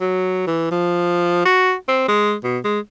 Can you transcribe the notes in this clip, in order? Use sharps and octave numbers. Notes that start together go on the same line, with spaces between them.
F#3
E3
F3
F#4
C4
G#3
B2
G#3